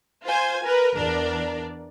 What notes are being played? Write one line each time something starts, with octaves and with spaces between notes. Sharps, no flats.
F4 C5 G#5
A#4 B4
E2 D4 A#4 D5